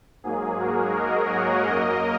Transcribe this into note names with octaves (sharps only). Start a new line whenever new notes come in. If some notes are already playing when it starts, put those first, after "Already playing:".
G#2 F#3 A#3 G#4
F#4 A#4
A#4 D#5
C#5 F#5
F#2 F#3 A#3 A#4 D#5